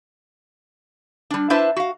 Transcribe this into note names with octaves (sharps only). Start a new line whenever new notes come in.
G3 D4
D4 E4 B4 C5 E5 A5
F#4 F5